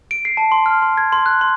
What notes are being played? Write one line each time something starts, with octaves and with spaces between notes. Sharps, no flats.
D7
C7
A5
C6
F6
C6
G#6
C6
F#6
C6